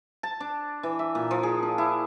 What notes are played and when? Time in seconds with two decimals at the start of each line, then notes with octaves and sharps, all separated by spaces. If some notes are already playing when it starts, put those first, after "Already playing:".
0.23 A5
0.40 D4
0.83 E3
0.99 E5
1.15 A#2
1.31 F3
1.43 G#4
1.63 D4
1.78 E4